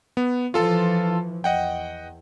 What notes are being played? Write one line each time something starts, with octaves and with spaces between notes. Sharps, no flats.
B3
E3 F3 F4 A4 A5
E2 D#5 F#5 G5